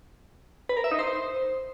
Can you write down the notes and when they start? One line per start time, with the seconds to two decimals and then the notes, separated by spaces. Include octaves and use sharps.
0.69 B4
0.77 A#4
0.84 E5
0.91 D#4
0.99 C5